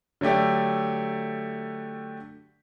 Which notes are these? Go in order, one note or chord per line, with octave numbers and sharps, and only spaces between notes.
D3 F#3 A3 G4 D5